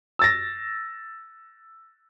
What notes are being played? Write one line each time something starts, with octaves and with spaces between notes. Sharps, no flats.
E6 A6 A#6